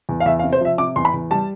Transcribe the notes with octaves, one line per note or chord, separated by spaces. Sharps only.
E2
F5
E2 E5
F5
C3
C5
F3 E5
C3 D6
E2 C6
B5
E2
G3 A5